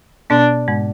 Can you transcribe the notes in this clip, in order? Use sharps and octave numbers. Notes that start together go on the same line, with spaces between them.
B2 B3 D4
G#2 G#3